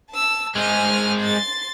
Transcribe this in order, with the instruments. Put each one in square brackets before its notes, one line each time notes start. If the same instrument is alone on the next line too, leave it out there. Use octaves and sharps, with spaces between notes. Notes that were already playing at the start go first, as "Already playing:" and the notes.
[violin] A5 E6
[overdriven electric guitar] G#3 C4 [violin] F6 D#7
[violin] C6 A6